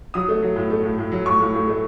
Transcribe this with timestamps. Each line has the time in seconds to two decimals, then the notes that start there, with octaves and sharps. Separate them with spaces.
0.14 F#3 D#6
0.29 A3
0.42 F#3
0.56 A2
0.70 A3
0.83 A2
0.98 A2
1.12 F#3
1.26 A2 C#6
1.40 A2
1.54 A2
1.68 A3